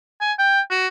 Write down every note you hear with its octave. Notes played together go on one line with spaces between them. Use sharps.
G#5
G5
F#4